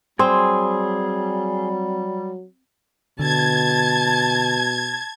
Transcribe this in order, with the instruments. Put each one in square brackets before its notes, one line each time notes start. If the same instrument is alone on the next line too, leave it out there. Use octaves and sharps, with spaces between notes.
[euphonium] F#3 [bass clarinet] G3 [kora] C4 [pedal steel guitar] G#4 C6
[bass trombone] B2 [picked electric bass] D3 [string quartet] A5 [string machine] G#6